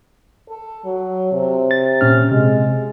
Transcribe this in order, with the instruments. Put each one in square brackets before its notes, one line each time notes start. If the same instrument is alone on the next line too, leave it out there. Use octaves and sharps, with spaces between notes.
[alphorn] A4
F#3
C3
[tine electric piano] A6
A#2 C#4 F6
[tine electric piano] C3 [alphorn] G#3